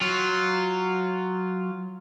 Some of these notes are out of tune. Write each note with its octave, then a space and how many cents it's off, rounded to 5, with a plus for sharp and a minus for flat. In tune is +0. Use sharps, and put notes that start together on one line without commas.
F#3 +0 F4 +0